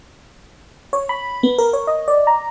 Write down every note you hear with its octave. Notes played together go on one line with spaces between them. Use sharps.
C#5
B5
B3
A#4
C#5
D#5
D5
A#5